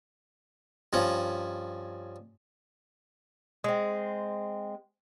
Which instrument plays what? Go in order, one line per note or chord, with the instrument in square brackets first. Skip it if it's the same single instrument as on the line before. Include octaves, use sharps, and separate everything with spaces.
[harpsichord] G2 F3 C#4
[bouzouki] G#3 C4